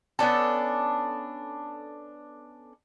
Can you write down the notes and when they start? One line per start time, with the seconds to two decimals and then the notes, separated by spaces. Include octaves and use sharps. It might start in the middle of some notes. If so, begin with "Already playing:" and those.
0.19 B3 C#4 D4 A4